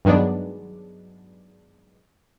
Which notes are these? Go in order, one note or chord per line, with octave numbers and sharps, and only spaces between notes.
G2 D#3 F#3 G#3 B3 D4